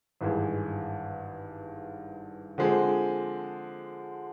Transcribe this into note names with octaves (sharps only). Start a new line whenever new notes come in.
G#1 G2 E3 G#3
D3 F3 G#3 C4